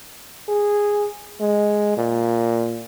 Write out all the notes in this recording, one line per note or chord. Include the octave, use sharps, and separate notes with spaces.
G#4
G#3
A#2